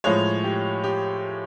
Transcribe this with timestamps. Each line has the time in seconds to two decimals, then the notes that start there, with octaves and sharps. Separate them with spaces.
0.04 A2 F3 G#3 C#5
0.44 G4
0.84 G4